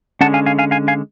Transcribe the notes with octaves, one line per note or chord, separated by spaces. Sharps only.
D3 G#3 C#4 F#5 A5
F5 G#5
F5 G#5
F5 G#5
F5 G#5
F5 G#5